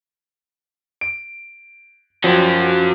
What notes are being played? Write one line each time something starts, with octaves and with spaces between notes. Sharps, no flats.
D7
F3 F#3 C#4 F#4 C#5 G5